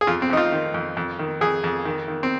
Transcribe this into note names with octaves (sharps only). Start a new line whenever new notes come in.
G#4
F2 F4
C4
F2 D#4
F4
D#3
F2
F2
D#3
F2 G#4
F2
D#3
D#3
C4